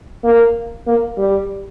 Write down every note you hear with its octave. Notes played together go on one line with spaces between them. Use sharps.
A#3
A#3
G3